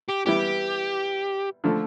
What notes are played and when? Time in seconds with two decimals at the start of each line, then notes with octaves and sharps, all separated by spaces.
0.09 G4
0.26 E3 G3 B3 E4 G4
1.64 D3 F3 A3